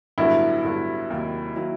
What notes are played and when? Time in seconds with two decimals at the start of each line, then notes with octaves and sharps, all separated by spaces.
0.18 A1 G2 D3 F#3 B3 E4
0.63 A1 G2 D3 F#3 B3
1.10 F1 D#2 D#3 F#3 A#3
1.56 D#3 F#3 A#3